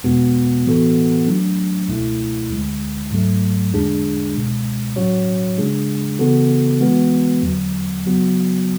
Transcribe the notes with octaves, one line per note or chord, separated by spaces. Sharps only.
E2 B2 G#3 B3 F#4
A2 E3 B3 F#4 A4
F#3 A3 D4
C#2 B2 A3 E4
D2 D3 G#3
G#2 F#3 A3
E2 D3 G#3 D4 G#4
C#2 B2 G#3
A2 F#3 C#4 F#4 C#5
C#3 G#3 D4 G#4
C#3 E3 B3 F#4 A4
E3 G#3 B3 F#4 B4
E2 D3 F#3
C#3 F#3 B3 F#4